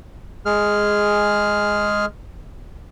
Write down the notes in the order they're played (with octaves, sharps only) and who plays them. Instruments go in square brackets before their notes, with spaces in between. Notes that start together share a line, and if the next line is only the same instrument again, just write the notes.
[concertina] G#3 G#4 F6